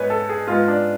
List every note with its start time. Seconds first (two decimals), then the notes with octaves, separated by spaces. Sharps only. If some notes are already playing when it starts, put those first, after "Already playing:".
Already playing: G#2 G#3 B3 B4 C#5
0.10 A4
0.29 G#4
0.47 G#2 G#3 B3 F4
0.68 D4